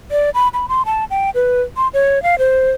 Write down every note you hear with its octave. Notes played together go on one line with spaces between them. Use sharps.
D5
B5
B5
C6
A5
G5
B4
C6
C#5
F5
C5